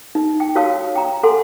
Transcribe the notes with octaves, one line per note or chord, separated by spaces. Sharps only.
D#4
G5
F#4 C#5 F5 A5 E6
G5 A#5
A4 F#5 G#5 C6